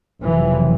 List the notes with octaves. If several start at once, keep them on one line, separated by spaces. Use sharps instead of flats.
F#1 F2 C3 E3